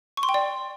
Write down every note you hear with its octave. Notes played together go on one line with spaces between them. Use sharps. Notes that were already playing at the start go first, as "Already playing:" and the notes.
C#6
C6
G5
D5